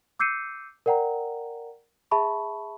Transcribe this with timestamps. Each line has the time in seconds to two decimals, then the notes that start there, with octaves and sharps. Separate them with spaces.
0.19 D6 E6 G6 C7 C#7 D#7
0.86 A#4 D5 F#5 G5 A#5
2.11 G#4 E5 A5 B5 C#6